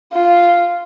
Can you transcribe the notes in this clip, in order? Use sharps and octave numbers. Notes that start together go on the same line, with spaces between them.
F4